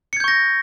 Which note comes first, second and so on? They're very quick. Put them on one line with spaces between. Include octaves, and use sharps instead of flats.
C#7 G#6 G6 C#6 A#6